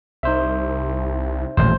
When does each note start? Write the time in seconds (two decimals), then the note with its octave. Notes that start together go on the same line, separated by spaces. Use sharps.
0.23 C2 D#4 C5 E5
1.57 D#1 A1 C5